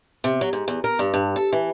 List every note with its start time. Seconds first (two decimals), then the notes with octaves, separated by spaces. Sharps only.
0.24 C3
0.41 F#3
0.53 G#2
0.68 E2
0.84 A#4
0.99 G2
1.14 G2
1.36 A4
1.53 E3